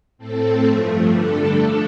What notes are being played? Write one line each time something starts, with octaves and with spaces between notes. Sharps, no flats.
A2 A3 C4 A4
G2 F3 A3
D3 G3 D4 A4
F3 A3 D4